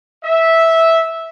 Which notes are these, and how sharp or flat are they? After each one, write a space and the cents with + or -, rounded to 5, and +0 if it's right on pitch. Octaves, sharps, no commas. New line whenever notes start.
E5 -10